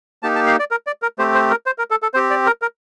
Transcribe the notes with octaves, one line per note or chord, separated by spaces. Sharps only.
A#3 D#4 G4 A5
A5
F5
D5
A#4
D5
A#4
A3 C4 G4 C5
C5
A#4
C5
A#4
A4
A4
C4 G4 C5
D5
A#4
A#4